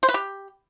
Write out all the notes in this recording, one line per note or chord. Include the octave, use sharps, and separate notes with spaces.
C5
B4
G4